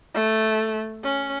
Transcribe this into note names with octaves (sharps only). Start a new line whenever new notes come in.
A3
C#4